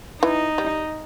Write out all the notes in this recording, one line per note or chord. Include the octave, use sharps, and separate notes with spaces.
E3 D#4
G3